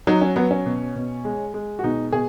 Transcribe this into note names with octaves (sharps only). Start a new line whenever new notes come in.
F#3 D#4
C#4
F#3 B3
C#4
B2
B2
G#3
G#3
F#4
B2 D#4
B2 G#4